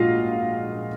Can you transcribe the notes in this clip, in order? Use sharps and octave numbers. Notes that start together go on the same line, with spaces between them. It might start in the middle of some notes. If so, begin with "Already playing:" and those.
Already playing: A#1 A#2 G#3 F4 F#4 D#5 F5